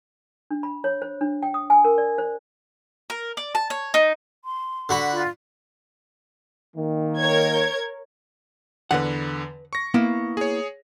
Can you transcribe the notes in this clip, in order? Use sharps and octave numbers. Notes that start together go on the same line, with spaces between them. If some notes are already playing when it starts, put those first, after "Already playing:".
D4
B5
C#5
C5
D4
G5
D#6
G#5
A#4
D5
C5
A#4
D5
A5
C#5
D#4
C6
D3 F#4 B5
F4
D#3 A#3
A#4 C#5 G#6
E2 D3 B4 F#5
C#6 A#6
A#3 B3 E4
G#4 C#5